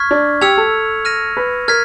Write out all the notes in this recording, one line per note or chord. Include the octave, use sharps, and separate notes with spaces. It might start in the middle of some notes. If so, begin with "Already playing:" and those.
Already playing: C#6 F6 G#6 B6
D4
G4 E6 G#6 C#7 F7
A4
F6 A#6 D#7
B4
A#4 F6 G#6 B6